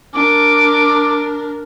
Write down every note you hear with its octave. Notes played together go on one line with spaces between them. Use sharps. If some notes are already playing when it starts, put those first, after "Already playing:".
D4 A#4 D6